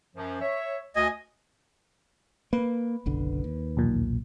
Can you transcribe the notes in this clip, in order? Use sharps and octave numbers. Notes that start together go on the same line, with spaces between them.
F#2 F3
C#5 E5
D2 D#5 G#5
A#3 B4
F#1 B1 D3
D#2
B1 E2 A#2